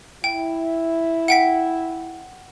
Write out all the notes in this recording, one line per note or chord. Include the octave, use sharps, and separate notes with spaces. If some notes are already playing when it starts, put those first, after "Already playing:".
E4 G5
F#5 G5 B6